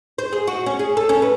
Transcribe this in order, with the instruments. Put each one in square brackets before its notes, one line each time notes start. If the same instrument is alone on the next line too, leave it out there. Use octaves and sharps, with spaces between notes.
[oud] C5
G#4
F#4
C#4
G#4
A4
C#4
B4